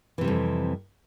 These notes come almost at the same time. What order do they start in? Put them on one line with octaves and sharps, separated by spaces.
E3 C3 G3 F2